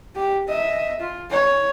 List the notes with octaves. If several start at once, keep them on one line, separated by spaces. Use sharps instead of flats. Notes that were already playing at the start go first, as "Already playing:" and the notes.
G4
D#5 E5
F4
C#5